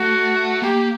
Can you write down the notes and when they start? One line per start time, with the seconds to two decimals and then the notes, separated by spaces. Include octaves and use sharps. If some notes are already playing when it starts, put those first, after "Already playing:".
Already playing: A3 F#4
0.62 A#3 G4